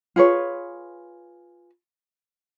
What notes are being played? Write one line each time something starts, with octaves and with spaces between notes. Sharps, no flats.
F4 G#4 B4 C#5